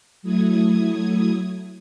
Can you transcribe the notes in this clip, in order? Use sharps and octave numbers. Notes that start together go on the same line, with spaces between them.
F#3 A3 E4 D#6 G#6